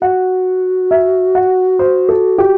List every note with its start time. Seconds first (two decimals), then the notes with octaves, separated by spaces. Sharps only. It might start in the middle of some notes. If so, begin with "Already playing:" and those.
0.01 F#4 F#5
0.91 E5
1.35 F#5
1.79 C5
2.09 A4
2.38 G4